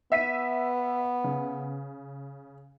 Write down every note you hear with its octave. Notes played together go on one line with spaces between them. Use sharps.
B3 E5 B6 D#7
C#3